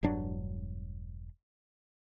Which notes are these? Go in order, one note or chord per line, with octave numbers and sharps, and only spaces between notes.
E1 G2 F#3 D4